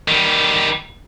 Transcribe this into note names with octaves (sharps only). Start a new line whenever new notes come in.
D#3 G3